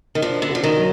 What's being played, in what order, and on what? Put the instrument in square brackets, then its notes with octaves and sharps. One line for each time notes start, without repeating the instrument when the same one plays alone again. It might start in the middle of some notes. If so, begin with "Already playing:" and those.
[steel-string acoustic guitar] D#3
[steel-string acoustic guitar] F3 [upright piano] D4
[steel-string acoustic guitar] D3
[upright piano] F#4
[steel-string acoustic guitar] F3
D#3
[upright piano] F#3